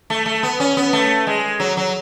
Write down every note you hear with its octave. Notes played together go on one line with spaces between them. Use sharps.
A3
A3
B3
C#4
B3
A3
G#3
F#3
F#3